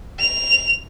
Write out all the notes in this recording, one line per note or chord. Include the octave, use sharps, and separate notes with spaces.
F7